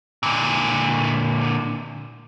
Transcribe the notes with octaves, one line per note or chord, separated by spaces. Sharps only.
A#2 D3